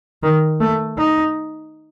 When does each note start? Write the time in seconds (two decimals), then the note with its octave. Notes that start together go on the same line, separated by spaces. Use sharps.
0.23 D#3
0.61 A3
0.98 D#4